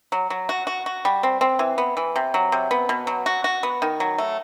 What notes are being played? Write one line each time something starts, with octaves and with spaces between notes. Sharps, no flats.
F#3
F#3
F#4
F#4
F#4
G3
C4
C4
E3
B3
E3
C3
F#3
C3
B3
B2
F#3
F#4
F#4
B3
D#3
F#3
A3